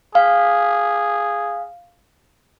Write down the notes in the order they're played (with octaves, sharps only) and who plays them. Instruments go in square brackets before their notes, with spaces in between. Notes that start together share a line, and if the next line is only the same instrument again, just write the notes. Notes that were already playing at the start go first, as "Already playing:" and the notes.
[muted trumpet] G#4 [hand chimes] F5